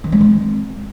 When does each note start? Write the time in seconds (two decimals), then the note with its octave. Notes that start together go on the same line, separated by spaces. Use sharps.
0.04 D#3
0.12 G#3
0.21 C4